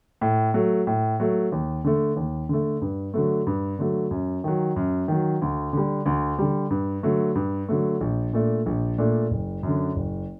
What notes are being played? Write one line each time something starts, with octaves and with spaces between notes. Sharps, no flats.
A2
F#3 A3
A2
F#3 A3
D#2
D3 A3
D#2
D3 A3
G2
D3 F#3 A3
G2
D3 F#3 A3
F#2
D#3 F#3
F#2
D#3 F#3
D2
D3 G3
D2
D3 G3
G2
D3 F#3 A3
G2
D3 F#3 A3
A#1
A#2 A3 D4
A#1
A#2 A3 D4
F#1
F#2 D3
F#1